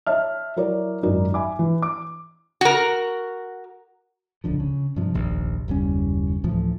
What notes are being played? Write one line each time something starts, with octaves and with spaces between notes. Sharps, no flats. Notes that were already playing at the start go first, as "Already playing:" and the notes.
C#5 D#5 E5 A5 F6
F#3 E4 A#4 C#5 D5
G#1 F#2 D#4 A#4 D5
E5 G#5 B5 D6
E3
D6
F#4 A#4
D#1 C#2 D3 F3
C#3
G2 C3 F3
F1 A#1 D#2
F#1 D#2 G3 C#4
D2 A2 E3 F3